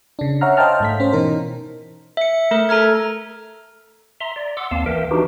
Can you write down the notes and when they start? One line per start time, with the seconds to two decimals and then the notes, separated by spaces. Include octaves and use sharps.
0.19 C#3 D4
0.41 C#5 E5 F#5 A#5 F6
0.57 C5 D#5 F5 G5 A5 F6
0.80 G#2 A3 B6
1.00 C#4 C5
1.13 B2 E3 D#4 A#4
2.17 E5 C#7
2.51 A3 A#4 E5
2.69 A4 A#5 F6 G#6
4.20 E5 A#5 C6
4.36 D5
4.57 F#5 C6 D6 E6
4.71 D#2 A#3 C4 F5 A5
4.86 E3 A#4 E5 G5
5.11 E3 D4 D#4 F#4 G4